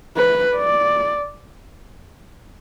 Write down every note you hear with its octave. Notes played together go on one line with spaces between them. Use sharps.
B4
D5